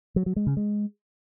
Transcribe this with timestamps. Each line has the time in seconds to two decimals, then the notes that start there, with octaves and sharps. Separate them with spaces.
0.16 F#3
0.26 F#3
0.36 G#3
0.47 C#3
0.57 G#3